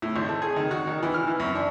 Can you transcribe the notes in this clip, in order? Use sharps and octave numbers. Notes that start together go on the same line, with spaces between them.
A2
G#1
A4
G#4
D#3
F#4
D#3
E3
F6
E3
F#2
D4